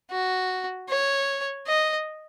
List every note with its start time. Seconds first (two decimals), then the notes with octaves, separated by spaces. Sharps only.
0.11 F#4
0.89 C#5
1.67 D#5